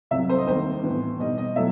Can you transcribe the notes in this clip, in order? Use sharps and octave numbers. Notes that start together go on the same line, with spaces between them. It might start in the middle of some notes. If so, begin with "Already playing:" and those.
C2 C3 F#3 E5
C5
D#5
D#2 D#3 G3 C5
A2 E3 B3
B2 G3 D#4 D#5
D#5
B2 F#3 A3 E4 E5